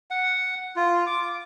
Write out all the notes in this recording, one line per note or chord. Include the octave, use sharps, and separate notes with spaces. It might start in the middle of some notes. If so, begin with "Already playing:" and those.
F#5
F4
D6